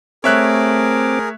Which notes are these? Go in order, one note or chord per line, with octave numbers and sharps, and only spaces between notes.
A3 C4 G#4 A#4 C#5 E5 D6 F#6